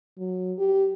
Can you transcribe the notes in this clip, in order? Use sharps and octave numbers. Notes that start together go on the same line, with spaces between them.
F#3
G4